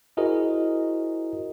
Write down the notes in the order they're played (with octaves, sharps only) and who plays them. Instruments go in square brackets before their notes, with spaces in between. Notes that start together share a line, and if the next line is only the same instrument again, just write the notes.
[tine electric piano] E4 F#4 G#4 A#4 C5 D#5